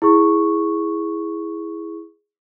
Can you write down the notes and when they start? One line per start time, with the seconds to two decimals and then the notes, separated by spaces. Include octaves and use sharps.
0.02 E4 G#4 C#6